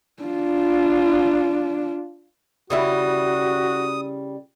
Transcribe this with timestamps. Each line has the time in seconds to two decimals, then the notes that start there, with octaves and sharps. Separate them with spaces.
0.23 D4 F4
2.70 C#3 G3 E4 F#4 D#6